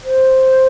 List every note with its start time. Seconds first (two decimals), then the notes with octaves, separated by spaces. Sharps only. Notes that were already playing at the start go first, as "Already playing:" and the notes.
0.04 C5